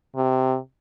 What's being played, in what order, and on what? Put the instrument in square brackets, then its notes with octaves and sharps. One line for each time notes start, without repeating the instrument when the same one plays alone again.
[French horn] C3